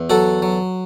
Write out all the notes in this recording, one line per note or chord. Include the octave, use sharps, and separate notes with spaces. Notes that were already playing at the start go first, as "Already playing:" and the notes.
Already playing: E2
F#3 F#4 A4
F#3